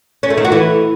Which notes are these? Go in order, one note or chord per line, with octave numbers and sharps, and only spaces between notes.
C#4
A3
D#3
F#4
E3